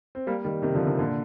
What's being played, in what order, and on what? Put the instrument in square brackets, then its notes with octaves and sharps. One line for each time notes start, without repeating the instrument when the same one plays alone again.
[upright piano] C4
G3 A#3
D#3 G3
C3 D#3
D3 F3
C3 D#3
A#2 D3